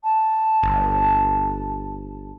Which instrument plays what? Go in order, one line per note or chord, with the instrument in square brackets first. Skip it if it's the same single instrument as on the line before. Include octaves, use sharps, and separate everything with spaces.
[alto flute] A5
[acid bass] G1